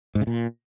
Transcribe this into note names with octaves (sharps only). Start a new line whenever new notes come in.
G#2
C#3
A#2